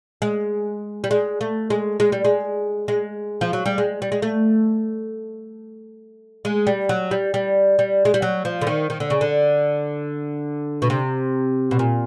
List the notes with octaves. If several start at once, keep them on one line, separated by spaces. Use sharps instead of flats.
G#3
G3
G#3
A3
G#3
G#3
G3
G#3
G#3
F3
F#3
G3
G#3
G3
G#3
A3
G#3
G3
F#3
G3
G3
G3
G#3
G3
F#3
F3
D3
D#3
D#3
D3
C#3
D3
B2
C3
B2
A#2